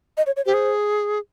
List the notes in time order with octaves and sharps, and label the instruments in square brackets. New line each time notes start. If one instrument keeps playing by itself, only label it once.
[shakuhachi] D#5
C#5
C#5
[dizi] G4 [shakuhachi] C5
[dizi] G#4